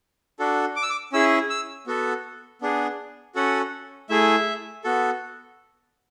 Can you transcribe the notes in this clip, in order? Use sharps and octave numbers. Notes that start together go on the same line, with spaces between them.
D4 F#4 A4
D6
E6
D6
C#4 E4 G#4 E6
E6
B3 F#4 A4
B3 D4 G#4
C#4 F#4 A4 F#5
A3 E4 G#4 E5
B3 F#4 A4